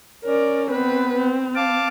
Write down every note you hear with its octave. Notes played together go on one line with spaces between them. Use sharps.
C#4 A#4 D5
B3 C4 B4
C4
F5 A5 D6